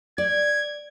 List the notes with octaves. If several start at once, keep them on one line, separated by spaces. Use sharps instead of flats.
D5 G#6